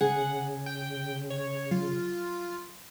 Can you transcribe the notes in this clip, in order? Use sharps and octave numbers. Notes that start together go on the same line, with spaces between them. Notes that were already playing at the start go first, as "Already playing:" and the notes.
C#3 G#4 F#5
G5
C#5
F#3 F4